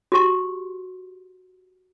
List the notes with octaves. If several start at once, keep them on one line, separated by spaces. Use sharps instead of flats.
F#4 G4 C6